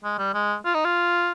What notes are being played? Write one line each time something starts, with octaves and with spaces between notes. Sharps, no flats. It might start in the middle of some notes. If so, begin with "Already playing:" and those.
G#3
G3
G#3
F4
D#4
F4